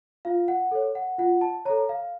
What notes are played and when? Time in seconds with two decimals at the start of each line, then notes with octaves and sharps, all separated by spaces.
0.25 F4 F5
0.48 F#5
0.71 A4 C#5
0.95 F#5
1.18 F4 F#5
1.41 A5
1.65 A4 C#5 A#5
1.89 F5